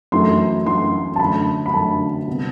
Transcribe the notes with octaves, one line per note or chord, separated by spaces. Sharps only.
F#2 E3 A3 C6
F#2 E3 A3 C6
A5
F#2 D3 A3 B5
B5
F#2 D3 A3 A5
C3 G3 B3